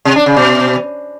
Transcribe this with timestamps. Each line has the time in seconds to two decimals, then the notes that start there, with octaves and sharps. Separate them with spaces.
0.05 C3
0.16 D4
0.26 C#3
0.37 B2